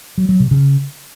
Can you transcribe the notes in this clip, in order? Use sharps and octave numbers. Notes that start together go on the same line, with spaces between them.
F#3
F#3
C3
C#3